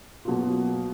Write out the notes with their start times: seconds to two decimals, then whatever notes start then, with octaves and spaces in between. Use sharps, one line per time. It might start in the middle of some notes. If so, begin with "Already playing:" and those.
0.25 B2 F#3 A#3 F4